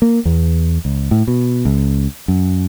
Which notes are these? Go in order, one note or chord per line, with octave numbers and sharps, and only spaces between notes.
A#3
E2
C#2
A2
B2
C#2
F#2